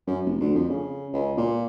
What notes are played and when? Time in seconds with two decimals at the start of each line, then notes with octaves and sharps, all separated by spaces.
0.07 F#2
0.25 F1
0.41 D2
0.55 F2
0.70 C#3
1.13 C#2
1.38 A#2